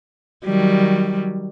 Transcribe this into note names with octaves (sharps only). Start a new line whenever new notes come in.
D#3 F#3 G3